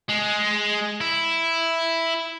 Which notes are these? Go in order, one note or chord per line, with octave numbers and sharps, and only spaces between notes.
G#3
E4